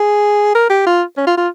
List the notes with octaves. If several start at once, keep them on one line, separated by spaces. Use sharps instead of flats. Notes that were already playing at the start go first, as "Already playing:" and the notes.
Already playing: G#4
A#4
G4
F4
C#4
F4
F4